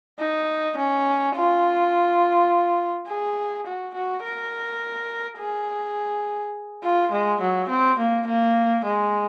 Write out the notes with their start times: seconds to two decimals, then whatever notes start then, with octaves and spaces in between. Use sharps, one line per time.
0.20 D#4
0.77 C#4
1.36 F4
3.08 G#4
3.67 F#4
3.95 F#4
4.24 A#4
5.39 G#4
6.83 F4
7.12 G#3
7.41 F#3
7.69 C4
7.99 A#3
8.27 A#3
8.85 G#3